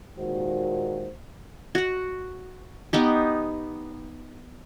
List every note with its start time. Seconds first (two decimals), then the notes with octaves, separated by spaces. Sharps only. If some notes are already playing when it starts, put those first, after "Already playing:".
0.17 D#2 A#2 D#3 G#3 F#4 C5
1.75 F#4 F#5
2.93 B3 D#4 G4